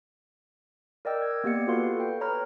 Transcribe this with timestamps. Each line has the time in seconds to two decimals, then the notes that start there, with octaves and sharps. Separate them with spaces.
1.05 A#4 D5 D#5 G5 E6
1.22 G#6
1.44 A#3 B3 G4 D5 F5 C#7
1.67 F4 F#4 A4 B4 F5 C6
1.97 A4 G5
2.20 B4 C#5 A#5 B5 F6